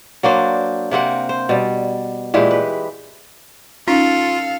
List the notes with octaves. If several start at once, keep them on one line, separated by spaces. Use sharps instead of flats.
F#3 A#3 D4 C5
C3 A#3 C4 F#5
C5
B2 G3
A#2 E3 G#3 G4
B4
C#4 D#4 F4 A4 F5